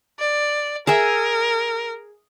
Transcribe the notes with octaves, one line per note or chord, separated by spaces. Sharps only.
D5
G#4 A#4 E5 G#5